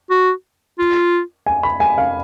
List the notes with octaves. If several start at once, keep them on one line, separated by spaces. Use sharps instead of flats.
F#4
F4
G#5
B5
G#5
F5